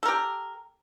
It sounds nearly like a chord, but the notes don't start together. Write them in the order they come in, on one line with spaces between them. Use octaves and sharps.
A4 A#4 G4